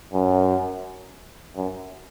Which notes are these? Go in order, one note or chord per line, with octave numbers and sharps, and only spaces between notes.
F#2
F#2